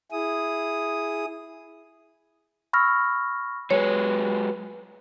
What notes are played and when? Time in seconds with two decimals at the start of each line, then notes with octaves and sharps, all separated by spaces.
0.12 E4 G#4 D#6
2.73 B5 C#6 E6 F6 A#6
3.71 F#3 G#3 B4 C#5